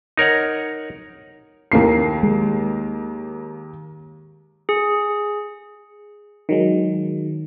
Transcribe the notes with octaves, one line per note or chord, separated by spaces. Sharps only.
D#4 A#4 C#5 F#5
D#2 A#3 C7
G#3
G#4
D#3 F#3 G#3